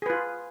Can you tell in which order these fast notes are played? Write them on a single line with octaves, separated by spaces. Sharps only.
G#4 B4 F4